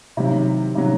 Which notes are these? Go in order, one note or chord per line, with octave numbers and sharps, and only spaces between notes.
C3 D#3 F#3 E4
C3 D#3 F#3